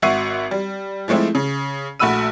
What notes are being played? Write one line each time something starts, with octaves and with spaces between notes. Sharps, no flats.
G#1 F#4 E5 C#6 C7 D#7
G3
F3 G#3 A3 C4 E4
C#3
A#1 A3 F#4 B5 E6 D#7